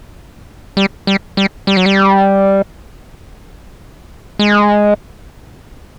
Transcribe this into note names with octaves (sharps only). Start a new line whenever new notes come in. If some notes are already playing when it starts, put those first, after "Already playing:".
G3
G3
G3
G3
F#3
G3
G#3